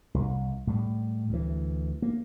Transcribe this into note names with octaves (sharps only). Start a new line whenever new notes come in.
C2
A2 G3
D2 E3
A#3